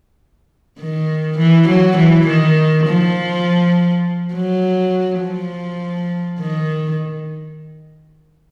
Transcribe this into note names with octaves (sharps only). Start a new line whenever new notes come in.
D#3
E3
F#3
E3
D#3
F3
F#3
F3
D#3